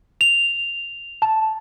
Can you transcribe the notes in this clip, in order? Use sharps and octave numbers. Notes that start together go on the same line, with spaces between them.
F7
A5